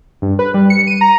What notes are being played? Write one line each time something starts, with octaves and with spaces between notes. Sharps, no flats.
G2
B4
G3
C#7
D#7
A#5